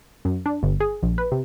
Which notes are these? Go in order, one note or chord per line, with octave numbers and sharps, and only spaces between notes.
F#2
D4
G1
G#4
A#1
B4
C3